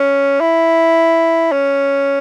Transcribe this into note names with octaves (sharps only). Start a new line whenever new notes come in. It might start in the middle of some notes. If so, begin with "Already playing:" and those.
Already playing: C#4
E4
C#4